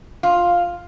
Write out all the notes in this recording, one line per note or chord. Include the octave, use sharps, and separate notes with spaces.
F4